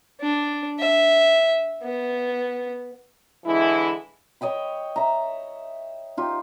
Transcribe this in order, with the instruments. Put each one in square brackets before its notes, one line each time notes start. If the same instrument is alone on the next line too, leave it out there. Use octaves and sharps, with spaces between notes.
[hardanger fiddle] D4
E5
B3
[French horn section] D3 E3 G#3 E4
[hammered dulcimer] C#5 D#5 G5 B5
E5 A#5
D#4 F4 G4